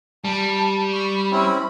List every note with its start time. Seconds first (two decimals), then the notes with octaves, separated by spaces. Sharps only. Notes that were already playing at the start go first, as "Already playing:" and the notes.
0.25 G3 A5
0.93 B5 C#6
1.32 C4 C#4 E4